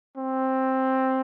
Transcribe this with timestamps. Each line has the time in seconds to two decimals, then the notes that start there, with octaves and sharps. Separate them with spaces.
0.18 C4